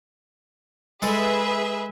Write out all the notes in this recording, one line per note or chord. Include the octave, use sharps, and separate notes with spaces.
G#3 G#4 A4 B4 E5